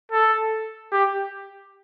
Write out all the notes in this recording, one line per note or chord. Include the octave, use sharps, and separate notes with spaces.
A4
G4